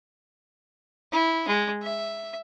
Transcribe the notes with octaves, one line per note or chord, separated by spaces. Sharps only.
E4
G#3
E5